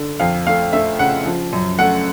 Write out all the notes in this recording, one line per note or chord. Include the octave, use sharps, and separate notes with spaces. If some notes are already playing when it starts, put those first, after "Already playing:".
Already playing: D3
F2 F5
A3 F5
A3 E5
C#3 F#5
F3
F#2
A3 F#5